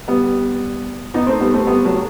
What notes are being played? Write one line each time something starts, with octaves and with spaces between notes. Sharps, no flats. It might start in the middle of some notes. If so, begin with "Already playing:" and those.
G3 B3
B3 D#4
A3 C4
G3 B3
A3 C4
G3 B3
F#3 A3